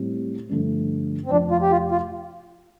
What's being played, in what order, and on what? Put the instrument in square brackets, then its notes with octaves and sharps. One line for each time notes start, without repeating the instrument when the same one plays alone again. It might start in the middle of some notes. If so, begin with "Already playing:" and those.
Already playing: [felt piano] A2 G3 C4 G4
G2 D3 F3 A3
[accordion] C4
[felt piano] F1 F2 F3 [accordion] D4
[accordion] F4
G4
F4
F4